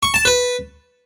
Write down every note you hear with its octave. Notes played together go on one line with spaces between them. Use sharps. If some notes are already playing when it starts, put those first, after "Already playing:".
C#6
A5
B4